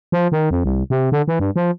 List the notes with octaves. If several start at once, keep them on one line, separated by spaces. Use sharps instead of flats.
F3
D#3
F2
C2
C3
D3
E3
G2
F3